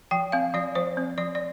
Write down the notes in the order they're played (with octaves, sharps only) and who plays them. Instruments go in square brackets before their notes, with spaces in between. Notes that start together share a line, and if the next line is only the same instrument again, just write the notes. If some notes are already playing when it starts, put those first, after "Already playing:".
[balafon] F3 G5
C4 F5
F3 D5
F3 C5
C4
F3 D5
D5